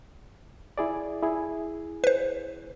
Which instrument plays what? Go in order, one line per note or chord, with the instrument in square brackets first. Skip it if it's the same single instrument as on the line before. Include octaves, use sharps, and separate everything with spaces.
[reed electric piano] E4 G#4 D5
E4 G#4
[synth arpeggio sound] B4 C5